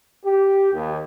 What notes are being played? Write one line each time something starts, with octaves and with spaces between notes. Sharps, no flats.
G4
D#2